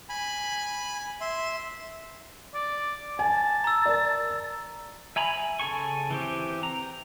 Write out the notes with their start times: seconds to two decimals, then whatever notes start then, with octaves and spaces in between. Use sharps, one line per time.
0.09 G#5 B5
1.21 E5 C6
2.54 D5
3.19 G#5 A5
3.64 A#5 E6
3.85 A#4 D5
5.16 E5 G#5 A#5 B5
5.60 C#3 A4 G#5 C#6
6.11 E3 C4 G4
6.63 A#5